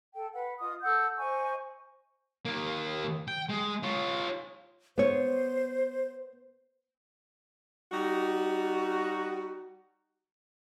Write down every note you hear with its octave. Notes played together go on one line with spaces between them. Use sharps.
A4 G5
B4 F#5
F4 D#5 D#6
A4 F#5 E6 G6
C5 D#5 G#5 C#6
D#2 A#3
G5
G#3
F4 C#5
B3 C5 C#5
G3 D#4 F#4